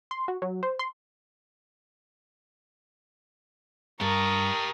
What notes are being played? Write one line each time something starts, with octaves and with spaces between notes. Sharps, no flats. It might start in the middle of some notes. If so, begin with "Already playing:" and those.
C6
F#4
F#3
C5
C6
G2 G4 A#4 A5 C#6 D#6